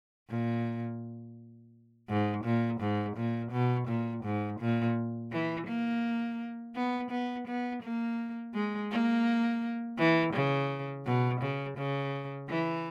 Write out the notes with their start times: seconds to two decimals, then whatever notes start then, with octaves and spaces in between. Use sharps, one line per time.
0.30 A#2
2.09 G#2
2.44 A#2
2.81 G#2
3.17 A#2
3.52 B2
3.88 A#2
4.24 G#2
4.60 A#2
5.32 E3
5.67 A#3
6.75 B3
7.11 B3
7.47 B3
7.83 A#3
8.54 G#3
8.91 A#3
9.98 E3
10.33 C#3
11.06 B2
11.41 C#3
11.78 C#3
12.49 E3